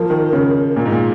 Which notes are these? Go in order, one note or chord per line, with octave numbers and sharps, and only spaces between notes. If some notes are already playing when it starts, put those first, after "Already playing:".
Already playing: F3 A#4
D#3
C#3
A#2
G#2
A#2